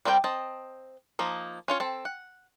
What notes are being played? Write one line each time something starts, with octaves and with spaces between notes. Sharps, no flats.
G3 C4 A#4 D#5 G5
C4 D#5 A5
F3 A#3 D#4
C#4 F4 C#5
C4 A4
F#5